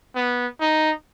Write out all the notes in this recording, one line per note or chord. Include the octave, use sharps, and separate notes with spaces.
B3
D#4